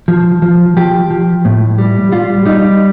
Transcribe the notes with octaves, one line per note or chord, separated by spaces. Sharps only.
F3
F3
F3 G4
F3
A2
G3
G3 F4
G3 D#4